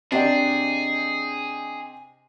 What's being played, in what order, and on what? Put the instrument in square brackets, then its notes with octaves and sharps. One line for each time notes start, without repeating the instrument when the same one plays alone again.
[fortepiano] C3 G4 D#5 [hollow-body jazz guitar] D4 [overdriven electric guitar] G#4